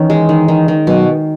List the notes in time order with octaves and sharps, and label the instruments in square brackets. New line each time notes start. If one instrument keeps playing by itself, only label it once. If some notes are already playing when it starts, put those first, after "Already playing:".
Already playing: [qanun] D#3 C#4 [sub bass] E3
[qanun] G#3
D#3
D#3
D#3
[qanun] B2 [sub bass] F#3